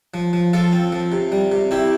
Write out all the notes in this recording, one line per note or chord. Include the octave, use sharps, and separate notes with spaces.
F3
F3
F3 F4 A4
C4
F3
C3
G3
C3
C3 E4 G4